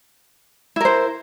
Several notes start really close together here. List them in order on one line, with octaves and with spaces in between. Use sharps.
E4 A#4 C5